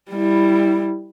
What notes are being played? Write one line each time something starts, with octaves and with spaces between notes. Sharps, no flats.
G3 E4